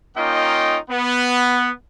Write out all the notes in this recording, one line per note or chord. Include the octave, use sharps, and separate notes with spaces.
A#3 C#4 D#4 F4 D#5 G5
B3